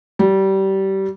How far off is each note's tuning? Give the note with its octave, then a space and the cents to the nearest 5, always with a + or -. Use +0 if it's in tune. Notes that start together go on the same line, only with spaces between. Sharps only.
G3 -25